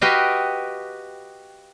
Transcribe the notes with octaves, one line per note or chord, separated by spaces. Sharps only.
F#4 G4 B4 D#5 F5 G5